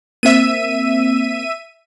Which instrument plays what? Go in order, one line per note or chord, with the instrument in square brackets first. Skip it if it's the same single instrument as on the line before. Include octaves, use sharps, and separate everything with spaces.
[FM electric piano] A#3 C4 [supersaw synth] E5 D#7